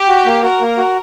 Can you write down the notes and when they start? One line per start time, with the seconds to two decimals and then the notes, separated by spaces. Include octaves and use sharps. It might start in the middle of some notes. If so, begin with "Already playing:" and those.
Already playing: G4
0.08 F#4
0.26 A#3
0.43 F#4 A#4
0.61 A#3
0.77 F#4